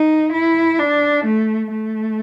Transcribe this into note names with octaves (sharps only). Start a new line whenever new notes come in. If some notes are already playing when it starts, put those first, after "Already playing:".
Already playing: D#4
E4
D4
A3
A3